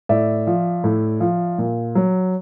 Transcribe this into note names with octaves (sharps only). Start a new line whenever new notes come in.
A2 D5 E5
F3
A2
F3
A#2
F#3